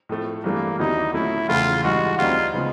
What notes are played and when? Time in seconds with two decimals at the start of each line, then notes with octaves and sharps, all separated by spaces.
0.09 A2 F3 A3
0.44 G2 E3 A3 A#3 D4
0.79 D#2 D3 F#3 B3 D#4 E4
1.13 A#2 F#3 A3 C#4 E4
1.49 E2 C#3 F3 A3 F4
1.84 G2 E3 G#3 F#4
2.18 D2 D3 G3 C4 D#4 F4
2.54 C#3 F3 G#3 B3